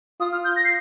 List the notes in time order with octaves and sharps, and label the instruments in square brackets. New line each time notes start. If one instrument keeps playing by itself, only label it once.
[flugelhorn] F4 [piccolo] D#6
[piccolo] F6
G6
A#6
C7